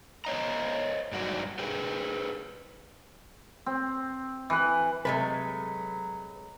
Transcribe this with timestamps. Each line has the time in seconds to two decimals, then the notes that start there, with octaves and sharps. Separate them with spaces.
0.25 C5 C#5 D#5 A#5
1.12 G2 F#3 D#4 F#4 D5
1.59 G4 G#4 B4
3.66 C4
4.50 E3 B4
5.05 C3 F#3 G#3 A3 B4